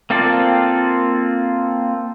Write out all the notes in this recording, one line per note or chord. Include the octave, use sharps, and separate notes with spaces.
A#3 C4 F4 A4 D5